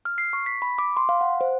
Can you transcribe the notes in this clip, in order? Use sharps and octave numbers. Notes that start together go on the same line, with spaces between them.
F6
C7
C#6
B6
B5
D6
C6
F5
F#5
C5